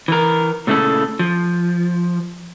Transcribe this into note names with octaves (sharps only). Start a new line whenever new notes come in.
E3 A#4
A#2 C#3 A3 E4 A4
F3